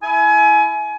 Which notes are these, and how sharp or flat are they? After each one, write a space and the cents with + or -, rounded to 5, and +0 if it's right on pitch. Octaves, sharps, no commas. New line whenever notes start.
E4 +0 G#5 +30